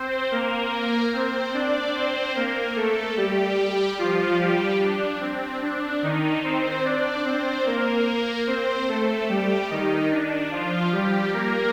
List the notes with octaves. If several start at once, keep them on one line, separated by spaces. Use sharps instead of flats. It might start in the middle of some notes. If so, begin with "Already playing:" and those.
Already playing: C4 C5
A#3 A#4
C4 C5
D4 D5
C4 C5
A#3 A#4
A3 A4
G3 G4
F3 F4
G3 G4
D4
C4
D4
D#3 D#4
C4 C5
D4 D5
C4 C5
A#3 A#4
C4 C5
A3 A4
G3 G4
D#3 D#4
D4
F3 F4
G3 G4
A#3 A#4